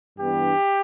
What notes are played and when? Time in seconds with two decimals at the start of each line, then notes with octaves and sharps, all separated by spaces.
0.18 G2 E3 B3 D4 G4